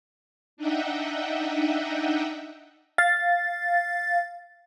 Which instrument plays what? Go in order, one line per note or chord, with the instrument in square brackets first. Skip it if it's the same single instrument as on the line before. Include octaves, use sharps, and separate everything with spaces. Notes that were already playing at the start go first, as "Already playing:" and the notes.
[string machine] D4 D#4 D#5 E5 F#5 G5
[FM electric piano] F5 A6